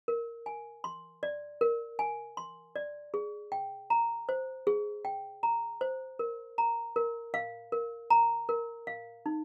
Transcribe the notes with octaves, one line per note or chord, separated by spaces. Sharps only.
A#4
G#5
C6
D5
A#4
G#5
C6
D5
G#4
G5
A#5
C5
G#4
G5
A#5
C5
A#4
A#5
A#4
F5
A#4
A#5
A#4
F5
D#4